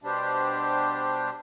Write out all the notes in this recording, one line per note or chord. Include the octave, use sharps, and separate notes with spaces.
B2 G3 D4 G4 C5